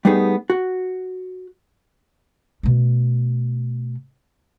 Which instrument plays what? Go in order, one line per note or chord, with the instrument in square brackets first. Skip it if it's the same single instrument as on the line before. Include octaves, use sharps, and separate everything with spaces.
[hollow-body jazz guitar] G3 A3 B3 D#4 G#4
F#4
[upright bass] B2 A3